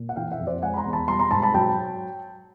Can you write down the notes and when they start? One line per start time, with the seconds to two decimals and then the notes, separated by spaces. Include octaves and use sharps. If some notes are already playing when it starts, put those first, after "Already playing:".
Already playing: A#2
0.09 F#5
0.16 E3 F5 G5
0.32 E5 F#5
0.39 F2
0.47 C5 D5
0.62 G#3 F#5 G#5
0.74 B5
0.77 A#5 C6
0.85 E2
0.93 A5 B5
1.08 G3 A#5 C6
1.19 A#5 C6
1.31 G#2 A5 B5
1.42 A5 B5
1.54 F#3 G5 A5